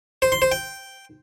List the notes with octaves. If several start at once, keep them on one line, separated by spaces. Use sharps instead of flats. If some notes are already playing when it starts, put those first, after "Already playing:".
C5
C6
C5
G5